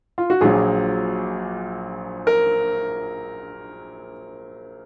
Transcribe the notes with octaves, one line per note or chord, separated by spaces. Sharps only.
F4
F#4
A#1 A#2 F#3 G#4
A#4